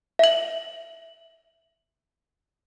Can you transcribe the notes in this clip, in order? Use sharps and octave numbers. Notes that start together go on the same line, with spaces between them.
E5 F#7